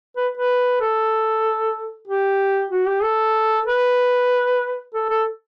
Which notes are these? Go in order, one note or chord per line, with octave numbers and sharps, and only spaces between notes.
B4
B4
A4
G4
F#4
G4
A4
B4
A4
A4